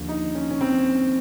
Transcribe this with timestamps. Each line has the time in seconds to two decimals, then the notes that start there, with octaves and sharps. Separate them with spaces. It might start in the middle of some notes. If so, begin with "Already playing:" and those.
Already playing: D#2 D3 F3
0.08 D#4
0.35 C#4
0.51 C#4
0.61 C4